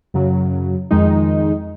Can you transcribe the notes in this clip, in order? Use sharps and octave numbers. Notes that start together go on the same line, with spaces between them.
F#2 C#3 F#3
F2 D#3 G#3 D#4